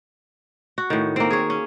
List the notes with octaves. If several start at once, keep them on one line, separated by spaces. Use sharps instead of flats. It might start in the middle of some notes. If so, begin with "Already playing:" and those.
F#4
A2 D#3
A#3 C4
G#4 C#5
C#4